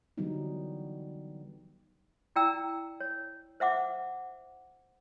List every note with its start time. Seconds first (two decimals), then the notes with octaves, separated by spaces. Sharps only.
0.17 D3 E3 F#3 G3 B3 D#4
2.36 E4 D5 G5 A#5 E6
3.00 C#5
3.60 C5 E5 F#5 D6